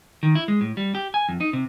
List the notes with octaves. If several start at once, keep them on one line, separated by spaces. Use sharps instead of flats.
D#3
E4
G#3
A2
G3
G4
G#5
F2
D#4
C3